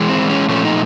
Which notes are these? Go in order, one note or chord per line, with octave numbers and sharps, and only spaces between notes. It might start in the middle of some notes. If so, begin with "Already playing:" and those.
Already playing: E3 G#3
C4
C#4
A#2 F3 A3 C#4
D#4